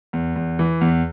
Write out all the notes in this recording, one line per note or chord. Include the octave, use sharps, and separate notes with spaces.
E2
E2
E3
E2